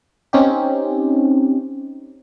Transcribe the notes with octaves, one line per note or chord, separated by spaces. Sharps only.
C4 C#4 D#4 G4